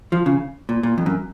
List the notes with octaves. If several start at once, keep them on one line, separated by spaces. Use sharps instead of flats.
F3
C#3
A#2
A#2
F2
F#2